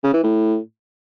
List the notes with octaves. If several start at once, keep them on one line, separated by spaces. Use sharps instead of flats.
C#3
E3
A2